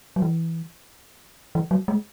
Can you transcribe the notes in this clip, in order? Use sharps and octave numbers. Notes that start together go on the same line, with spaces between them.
F#3
E3
E3
F#3
G#3